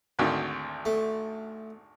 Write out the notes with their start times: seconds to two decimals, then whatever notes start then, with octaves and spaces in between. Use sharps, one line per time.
0.19 G#1 D2 D#3
0.86 A3